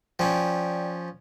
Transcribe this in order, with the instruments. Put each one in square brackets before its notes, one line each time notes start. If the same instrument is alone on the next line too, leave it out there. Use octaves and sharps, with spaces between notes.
[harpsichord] F3 C#4 [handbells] D5 G5